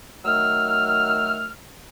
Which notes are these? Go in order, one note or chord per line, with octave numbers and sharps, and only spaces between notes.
D#3 F#3 A3 E6 F6